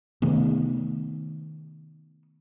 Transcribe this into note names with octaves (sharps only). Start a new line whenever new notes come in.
C3 D#3 A3 B3